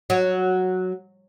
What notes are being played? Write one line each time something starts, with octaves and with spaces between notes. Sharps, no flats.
F#3